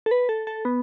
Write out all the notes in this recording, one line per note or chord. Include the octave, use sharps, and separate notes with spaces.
A4
B4
A4
A4
B3